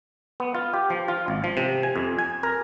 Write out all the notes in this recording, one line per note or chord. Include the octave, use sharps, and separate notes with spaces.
B3
F4
G4
F3
F4
G#1
F3
C3
G#5
F2
G#5
A#4